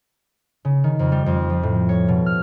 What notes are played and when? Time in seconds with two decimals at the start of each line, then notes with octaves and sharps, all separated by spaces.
0.65 C#3
0.84 D#3
0.99 F2
1.12 G3
1.26 F2
1.50 F3
1.63 A2
1.89 C#5
2.08 B2
2.26 F6